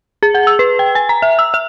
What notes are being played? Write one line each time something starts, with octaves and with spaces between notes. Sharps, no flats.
G#4
F#5
E6
B4
G5
G#5
A#5
E5
E6
E5